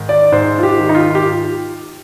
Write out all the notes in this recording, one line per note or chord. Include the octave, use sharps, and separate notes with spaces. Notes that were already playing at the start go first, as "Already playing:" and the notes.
Already playing: G#2 D#3
D5
G#2 C5
F4
G4
D#3
D#4
F4
G4